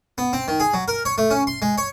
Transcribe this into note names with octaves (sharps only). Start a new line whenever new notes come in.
B3
C4
D#3
G#4
F#3
A#4
C#5
A3
C#4
C6
G#3
C#5